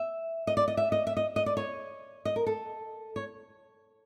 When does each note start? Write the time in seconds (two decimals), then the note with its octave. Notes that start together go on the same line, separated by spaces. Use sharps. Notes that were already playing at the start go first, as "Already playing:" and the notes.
Already playing: E5
0.47 D#5
0.57 D5
0.68 D#5
0.77 E5
0.92 D#5
1.07 E5
1.17 D#5
1.36 D#5
1.46 D5
1.57 C#5
2.25 D#5
2.36 A#4
2.46 A4
3.16 C#5